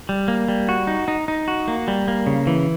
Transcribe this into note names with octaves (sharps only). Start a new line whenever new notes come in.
G3
A#3
G3
F#4
D#4
D#4
D#4
F#4
A#3
G3
A#3
C#3
E3